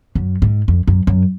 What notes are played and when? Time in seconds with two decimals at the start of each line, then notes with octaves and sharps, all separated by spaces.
0.15 F#2
0.42 G#2
0.68 F2
0.88 F#2
1.07 F#2